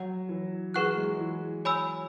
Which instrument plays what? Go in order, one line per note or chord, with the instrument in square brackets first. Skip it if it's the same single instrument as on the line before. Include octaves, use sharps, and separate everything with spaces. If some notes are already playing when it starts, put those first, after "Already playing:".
Already playing: [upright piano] F#3 [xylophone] C#5 F#5
[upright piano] E3
[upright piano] E3 [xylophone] G#4 B4 F#5 C#6 F#6
[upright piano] G#3
E3
[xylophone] C#5 G#5 B5 E6